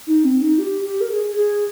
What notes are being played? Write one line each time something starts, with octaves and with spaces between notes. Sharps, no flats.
D#4
C4
D#4
G4
G4
A#4
G#4
G#4